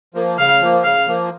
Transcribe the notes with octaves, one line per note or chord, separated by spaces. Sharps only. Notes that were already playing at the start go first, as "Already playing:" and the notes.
F3 A#3
C#3 F5
F3 A#3
C#3 F5
F3 A#3